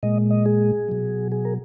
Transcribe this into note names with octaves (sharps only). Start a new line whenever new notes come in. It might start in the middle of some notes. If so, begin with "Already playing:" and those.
A#2 G#3 D#5
D#5
G#4
B2 F#3
G#4
A#4